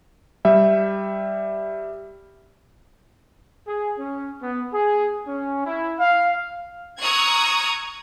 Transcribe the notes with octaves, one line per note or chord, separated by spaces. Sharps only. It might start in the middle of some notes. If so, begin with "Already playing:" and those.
G3 E5 G5
G#4
C#4
B3
G#4
C#4
E4
F5
A#5 C#6 D#6 E6 F#6 G#6